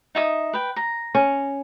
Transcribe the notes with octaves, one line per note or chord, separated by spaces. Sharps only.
D#4 E5 D#6
B4 G5
A#5
C#4